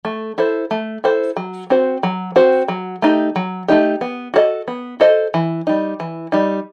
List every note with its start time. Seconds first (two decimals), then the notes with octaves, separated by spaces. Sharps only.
0.05 A3
0.38 E4 A4 C5
0.71 A3
1.04 E4 A4 C5
1.37 F#3
1.70 C4 F#4 C5
2.03 F#3
2.36 C4 F#4 C5
2.68 F#3
3.02 A3 D#4 G4
3.36 F#3
3.68 A3 D#4 G4
4.01 B3
4.34 F#4 A4 C5 D#5
4.68 B3
5.00 F#4 A4 C5 D#5
5.34 E3
5.67 G3 D#4
6.00 E3
6.32 G3 D#4